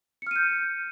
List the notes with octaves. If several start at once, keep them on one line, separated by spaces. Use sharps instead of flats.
F6 G6 C#7 D#7